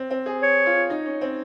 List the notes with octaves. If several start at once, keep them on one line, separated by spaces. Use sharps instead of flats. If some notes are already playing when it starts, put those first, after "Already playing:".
Already playing: C4
C4
G#4
C#5
F4
D#4
C#4
C4